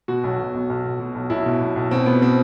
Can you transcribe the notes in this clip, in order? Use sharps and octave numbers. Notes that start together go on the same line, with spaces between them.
B2 F#4
B1
B2
B1
B1
B2
B2
B1
B1 E4
B2
B1
B1
B2 C4
B2 B3
B2 C4